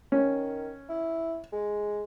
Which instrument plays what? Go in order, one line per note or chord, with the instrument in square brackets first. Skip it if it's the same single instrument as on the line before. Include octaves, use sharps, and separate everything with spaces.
[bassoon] D#3 [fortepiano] C#4
[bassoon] E4
G#3